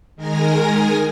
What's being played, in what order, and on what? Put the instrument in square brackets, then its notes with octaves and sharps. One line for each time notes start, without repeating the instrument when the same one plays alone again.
[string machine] D#3 G#3 A#4 G#5 A#6